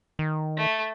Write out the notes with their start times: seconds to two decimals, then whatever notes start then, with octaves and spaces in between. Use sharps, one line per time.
0.19 D#3
0.57 A3